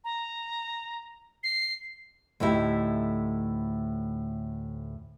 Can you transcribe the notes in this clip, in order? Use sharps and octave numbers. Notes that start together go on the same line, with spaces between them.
A#5
C7
D2 A2 D#4 E4 G4